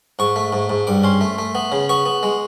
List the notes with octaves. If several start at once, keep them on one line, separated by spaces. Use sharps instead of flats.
G#2 C#6
A3
G#2
G#2
G2 D6
C#4 C6
A3
A3
B3
C#3
B3 C#6
B3
G#3